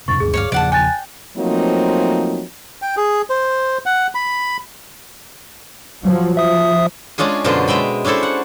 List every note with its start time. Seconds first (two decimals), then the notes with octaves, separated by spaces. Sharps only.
0.08 F2 G#2 C3 C#6 A6
0.20 D#1 D2 G2 G#4
0.34 C#5 D5 F5
0.52 E2 C#3 F3 D5 F#5 A5
0.72 G5 G#5 F#6 A6
1.37 F3 F#3 A3 A#3 C4 D#4
2.82 G5
2.97 G#4
3.30 C5
3.86 F#5
4.15 B5
6.04 F3 F#3
6.37 F3 E5 D#6
7.18 G#3 C#4 D4 F4 G#4
7.44 F#2 B2 D3 F4 C5
7.68 G#3 E5 G5 B5
8.04 C#4 D4 E4 A4 C5
8.23 F#5